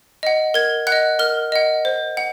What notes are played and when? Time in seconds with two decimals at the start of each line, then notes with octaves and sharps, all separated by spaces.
0.23 D#5 F#5
0.54 A#4 G#6
0.87 F#5 F#6
0.92 D#5
1.19 A#4 F6
1.52 D#5 F#5
1.85 C5
2.17 F#5